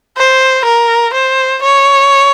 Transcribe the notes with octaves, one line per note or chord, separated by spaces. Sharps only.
C5
A#4
C5
C#5